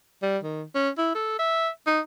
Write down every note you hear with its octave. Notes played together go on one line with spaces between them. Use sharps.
G3
D#3
C#4
E4
A4
E5
D#4